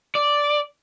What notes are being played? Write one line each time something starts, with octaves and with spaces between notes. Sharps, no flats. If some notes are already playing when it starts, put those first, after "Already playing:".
D5